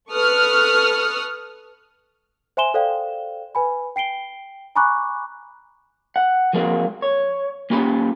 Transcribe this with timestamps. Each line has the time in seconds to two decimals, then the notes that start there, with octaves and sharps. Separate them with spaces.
0.11 A4 B4 C#6 D#6 F6 F#6
2.57 C5 E5 G#5 C6 E7 G7
2.74 A4 C5 D5 F5 G5
3.55 B4 G#5 B5
3.96 G5 C7 D7 G7
4.76 G#5 A#5 B5 C#6 D6 F#6
6.16 F#5
6.53 F3 G#3 A#3 C4 F4 F#4
7.02 C#5
7.70 A#3 C#4 F4 G4 A#5 B5